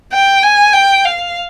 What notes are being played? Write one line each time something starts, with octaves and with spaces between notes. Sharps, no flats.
G5
G#5
G5
F5